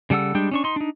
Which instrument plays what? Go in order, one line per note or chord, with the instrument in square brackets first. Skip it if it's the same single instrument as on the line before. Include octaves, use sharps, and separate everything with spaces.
[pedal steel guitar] C#3 G3 A4 F#5 E6
G3 G#3 D4 G5
C#4 D4 C#6
D#4 C6
D4 D#4